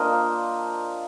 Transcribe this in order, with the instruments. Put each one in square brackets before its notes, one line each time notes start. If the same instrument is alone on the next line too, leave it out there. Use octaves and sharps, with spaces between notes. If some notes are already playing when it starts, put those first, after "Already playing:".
Already playing: [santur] A#3 D4 F4 C5 D#5